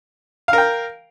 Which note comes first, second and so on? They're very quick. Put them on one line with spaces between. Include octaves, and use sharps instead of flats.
F5 A#4 G5